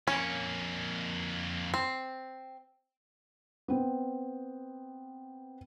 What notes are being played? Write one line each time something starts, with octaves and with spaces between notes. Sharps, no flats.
F2 A#3 C#4
C4
B3 C4